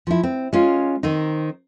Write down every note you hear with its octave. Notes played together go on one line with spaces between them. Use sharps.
F3 E4
C4
G#3 C#4 F4
D#3 C4 D#4